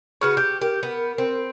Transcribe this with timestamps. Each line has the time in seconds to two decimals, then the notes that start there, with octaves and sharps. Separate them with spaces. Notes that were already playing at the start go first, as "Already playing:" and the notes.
0.21 C#3 F#4 B4 C#6 F6
0.37 G4 G6
0.61 G4 A#4
0.83 B3
1.18 C4